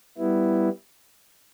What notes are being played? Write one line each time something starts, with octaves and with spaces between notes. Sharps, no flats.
G3 B3 E4